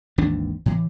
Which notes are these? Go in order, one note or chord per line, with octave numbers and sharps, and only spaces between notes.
G#1 D#2 E3 D4
A2 E3